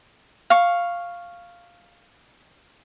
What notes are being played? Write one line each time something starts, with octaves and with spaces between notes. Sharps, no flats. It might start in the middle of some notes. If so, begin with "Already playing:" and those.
F5 C#6